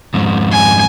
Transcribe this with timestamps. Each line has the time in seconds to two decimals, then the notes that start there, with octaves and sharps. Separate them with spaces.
0.14 F2 G#2
0.51 G#5